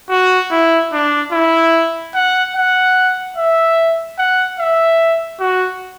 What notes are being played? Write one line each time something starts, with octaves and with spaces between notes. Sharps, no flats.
F#4
E4
D4
E4
F#5
F#5
E5
F#5
E5
F#4